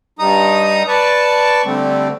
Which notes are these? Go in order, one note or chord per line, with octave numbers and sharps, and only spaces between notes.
G2 G3 D#4 A#5 D#6
B4 D5 A5 C#6
D3 G3 A3 C4